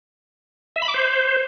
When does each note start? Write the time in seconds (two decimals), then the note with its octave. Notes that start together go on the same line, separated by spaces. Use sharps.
0.76 E5
0.82 B5
0.88 D6
0.94 C5